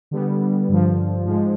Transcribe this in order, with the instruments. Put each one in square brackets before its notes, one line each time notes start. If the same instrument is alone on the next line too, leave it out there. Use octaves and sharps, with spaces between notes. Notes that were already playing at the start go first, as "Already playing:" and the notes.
[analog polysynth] D3 G3 B3
G2 D3 F3
G#2 F3 G#3